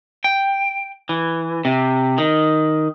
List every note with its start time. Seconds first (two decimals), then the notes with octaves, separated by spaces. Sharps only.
0.24 G5
1.09 E3
1.65 C3
2.18 D#3